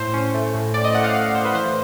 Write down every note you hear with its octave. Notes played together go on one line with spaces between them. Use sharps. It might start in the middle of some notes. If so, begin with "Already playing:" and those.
Already playing: A2 C5
C#4
A3
A2
A2 D5
D#5
A3 F#5
F5
A3 F5
A2 C5
B4
E3 C5